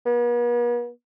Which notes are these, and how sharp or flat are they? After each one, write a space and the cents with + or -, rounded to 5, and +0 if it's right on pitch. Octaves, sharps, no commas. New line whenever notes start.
B3 -45